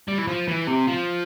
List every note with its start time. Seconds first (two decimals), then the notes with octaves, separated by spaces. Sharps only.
0.08 G3
0.18 E3
0.27 F3
0.48 E3
0.67 C3
0.87 F3